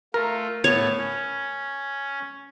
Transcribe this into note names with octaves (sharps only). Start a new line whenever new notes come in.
A3 F4 A#4
A2 B3 C#5 A5
C#4